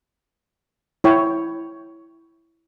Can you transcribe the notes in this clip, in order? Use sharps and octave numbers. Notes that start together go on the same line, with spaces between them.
E4 C#5 G5